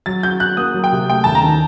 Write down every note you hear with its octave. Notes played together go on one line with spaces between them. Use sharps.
F#3 A6
F#4 G6
F#4 F#6
A#3 D#6
F#3
G5
C3
A3 G5
D#2 A5
A#5
D#3